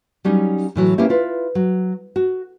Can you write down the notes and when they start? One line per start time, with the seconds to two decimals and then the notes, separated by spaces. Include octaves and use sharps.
0.25 F#3 G3 C#4 D#4
0.76 A2 E3 F#3
0.98 A#3 B3 C#4 E4 G4
1.09 E4 F4 B4
1.55 F#3
2.16 F#4